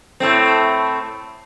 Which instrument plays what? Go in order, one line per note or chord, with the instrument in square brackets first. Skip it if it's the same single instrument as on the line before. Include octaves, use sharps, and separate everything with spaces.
[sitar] A2 A3 C4